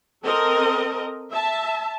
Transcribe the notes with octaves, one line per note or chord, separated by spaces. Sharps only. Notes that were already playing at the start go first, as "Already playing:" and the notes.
C4 A4 A#4 D#5
E5 A5